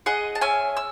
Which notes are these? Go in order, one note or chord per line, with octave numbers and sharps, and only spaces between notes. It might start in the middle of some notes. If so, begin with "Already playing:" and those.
G#4 D#5 F#5
A5
C#4 E5 G#5
E6